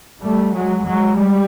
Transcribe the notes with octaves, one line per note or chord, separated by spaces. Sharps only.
G3 A3
F#3 G#3
F#3 G#3
G3